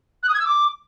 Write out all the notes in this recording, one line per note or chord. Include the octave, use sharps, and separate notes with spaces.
F#6
D#6
G#6
E6
D6